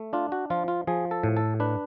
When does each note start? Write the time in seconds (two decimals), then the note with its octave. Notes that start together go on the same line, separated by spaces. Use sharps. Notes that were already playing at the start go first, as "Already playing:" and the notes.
Already playing: A3
0.13 D4 F4
0.32 F#4
0.50 F3 F4
0.68 F4
0.87 F3 G#4
1.11 A4
1.23 A2
1.37 A4
1.60 D4 B4